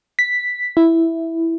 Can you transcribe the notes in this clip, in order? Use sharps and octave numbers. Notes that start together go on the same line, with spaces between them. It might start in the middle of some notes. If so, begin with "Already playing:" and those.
B6
E4